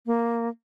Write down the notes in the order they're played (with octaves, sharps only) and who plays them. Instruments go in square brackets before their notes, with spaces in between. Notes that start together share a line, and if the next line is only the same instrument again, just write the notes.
[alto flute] A#3